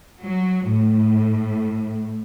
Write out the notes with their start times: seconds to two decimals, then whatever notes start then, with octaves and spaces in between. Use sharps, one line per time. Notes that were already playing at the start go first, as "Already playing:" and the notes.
0.23 F#3
0.68 A2